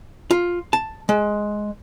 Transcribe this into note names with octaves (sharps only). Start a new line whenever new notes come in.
F4
A5
G#3